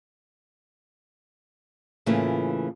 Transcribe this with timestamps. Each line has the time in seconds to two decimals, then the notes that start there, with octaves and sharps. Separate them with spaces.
2.06 A2 C#3 E3 A3 A#3 F4